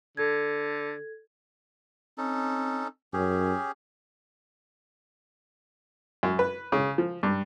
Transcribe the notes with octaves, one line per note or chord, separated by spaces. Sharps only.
D3 A4 G#6
C4 C#4 D#4 A4
F#2 C#4 G4 G#4
F#2
B4
C#3
F3
G2